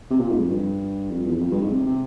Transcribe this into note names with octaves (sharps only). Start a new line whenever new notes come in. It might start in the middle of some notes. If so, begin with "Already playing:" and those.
C3
A#2
G#2
F2
G2
F2
E2
F2
G2
G#2
C3
C3